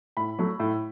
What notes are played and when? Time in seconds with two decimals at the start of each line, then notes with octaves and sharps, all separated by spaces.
0.17 A2 B5
0.39 F#3 A3
0.60 A2